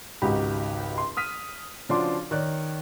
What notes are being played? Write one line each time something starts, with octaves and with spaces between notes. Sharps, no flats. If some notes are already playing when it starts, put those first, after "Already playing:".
G#1 C#2 D#4 F#4 G4 B5
C6
D#6 F6 B6 D#7
C#3 F3 D4 F#4 C6 D6
D#3 C#5 D5 F#6